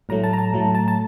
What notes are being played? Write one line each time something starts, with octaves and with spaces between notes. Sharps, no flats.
A2 F#3 A3 A#5
A5
A#5
A5
A2 F#3 A3
A5
A5